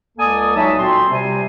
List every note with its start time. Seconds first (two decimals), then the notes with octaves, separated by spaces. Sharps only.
0.18 C#2 A#3 A4 D5 G#5 D#6
0.56 C#2 F#3 D#4 F#4 E5 A5
0.78 A#2 C4 F#4 C6
1.11 C3 G3 C5 G#5